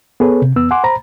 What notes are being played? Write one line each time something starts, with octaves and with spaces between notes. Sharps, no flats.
B3 G#4 A4 B4 C#5
C3
E2 B3 E6
F#5 G#5 C6 D6
C5 A#5 B5